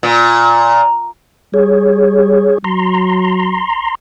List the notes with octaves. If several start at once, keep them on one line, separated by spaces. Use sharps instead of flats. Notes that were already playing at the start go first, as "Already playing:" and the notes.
A#2
G3 G#4 C#5
F#3 A#5 C6